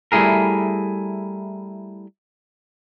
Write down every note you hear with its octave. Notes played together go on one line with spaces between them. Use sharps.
G3 A3 E4 G#4 A#4